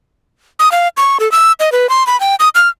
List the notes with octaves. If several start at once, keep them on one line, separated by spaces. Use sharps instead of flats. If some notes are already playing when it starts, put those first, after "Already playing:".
D#6
F5
C#6
A4
E6
D#5
B4
C6
B5
G5
D#6
F6